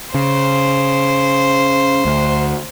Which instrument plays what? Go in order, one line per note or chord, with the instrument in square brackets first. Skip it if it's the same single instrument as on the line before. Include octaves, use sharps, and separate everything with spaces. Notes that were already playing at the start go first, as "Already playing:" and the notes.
[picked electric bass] C#3 [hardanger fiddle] C5
[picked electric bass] D2